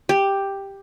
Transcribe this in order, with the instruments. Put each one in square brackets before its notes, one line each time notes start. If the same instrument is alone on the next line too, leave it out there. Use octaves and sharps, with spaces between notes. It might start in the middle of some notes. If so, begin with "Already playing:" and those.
[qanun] G4